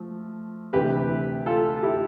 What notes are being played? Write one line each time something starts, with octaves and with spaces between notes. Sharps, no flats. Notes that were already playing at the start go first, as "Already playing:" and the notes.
Already playing: F3 A3
D2 C3 E3 G4 B4
F4 A4
E4 G4